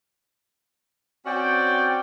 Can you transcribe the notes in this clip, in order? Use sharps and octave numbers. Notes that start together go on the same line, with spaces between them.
C4 C#4 F#4 D5 G5